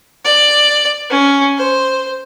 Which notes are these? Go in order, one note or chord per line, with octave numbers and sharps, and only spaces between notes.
D5
C#4
C5